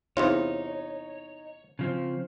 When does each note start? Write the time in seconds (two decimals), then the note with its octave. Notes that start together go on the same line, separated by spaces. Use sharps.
0.17 E2 C3 D#4 F4 C#5
1.79 C#3 F3 C4